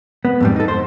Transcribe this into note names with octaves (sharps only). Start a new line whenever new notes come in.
B3
F2 G#2 G3
D#4 A4
C5